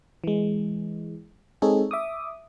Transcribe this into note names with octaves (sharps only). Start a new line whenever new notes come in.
E3 G#3
G#3 C4 D#4 G#4 A4 C#5
E5 D6 D#6